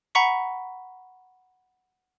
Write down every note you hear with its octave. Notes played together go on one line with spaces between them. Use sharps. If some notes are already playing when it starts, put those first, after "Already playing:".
F#5 A#5 B5 C#6 B6 C#7